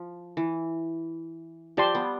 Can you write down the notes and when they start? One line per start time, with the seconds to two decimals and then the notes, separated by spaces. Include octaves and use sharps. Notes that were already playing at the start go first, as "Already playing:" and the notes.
Already playing: F3
0.37 E3
1.77 F3 G4 D5 A5 C6
1.95 G3 B3